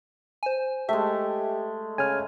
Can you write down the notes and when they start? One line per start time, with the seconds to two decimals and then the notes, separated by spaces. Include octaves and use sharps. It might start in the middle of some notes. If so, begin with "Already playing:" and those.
0.43 C5 G#5
0.89 G#3 A3 G4 E5
1.98 C#3 G#5 F6